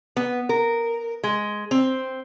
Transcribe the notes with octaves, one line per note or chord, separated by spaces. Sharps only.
B3
A#4
G#3
C4